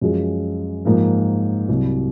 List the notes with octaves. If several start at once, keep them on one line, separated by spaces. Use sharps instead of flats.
F#2 F3 G#3
G#2 F3 A#3
C2 C3 F#3